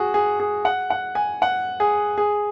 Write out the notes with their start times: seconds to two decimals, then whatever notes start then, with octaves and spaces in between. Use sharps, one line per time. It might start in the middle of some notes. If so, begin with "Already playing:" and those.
Already playing: F#4 G#4
0.14 G#4
0.40 G#4
0.65 F#5
0.90 F#5
1.15 G#5
1.42 F#5
1.80 G#4
2.18 G#4